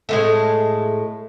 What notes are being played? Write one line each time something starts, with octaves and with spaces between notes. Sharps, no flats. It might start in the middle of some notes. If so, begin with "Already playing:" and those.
A2 G#3 A3